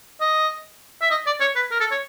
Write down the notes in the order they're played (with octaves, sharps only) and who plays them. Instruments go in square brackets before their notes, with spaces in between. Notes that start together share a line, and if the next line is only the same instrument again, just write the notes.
[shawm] D#5
E5
D#5
D5
C#5
B4
A#4
A4
C#5